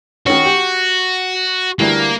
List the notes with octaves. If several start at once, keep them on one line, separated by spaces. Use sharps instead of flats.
D#3 C#4 F#4
G4
D2 E3 G3 A#3